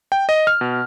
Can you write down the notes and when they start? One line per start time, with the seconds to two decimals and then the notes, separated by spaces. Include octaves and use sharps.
0.12 G5
0.29 D#5
0.47 F6
0.61 B2